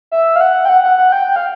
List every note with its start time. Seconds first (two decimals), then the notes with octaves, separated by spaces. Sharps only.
0.12 E5
0.36 F5
0.41 F#5
0.65 G5
0.69 F#5
0.84 F#5
0.98 F#5
1.12 G5
1.27 G5
1.36 F5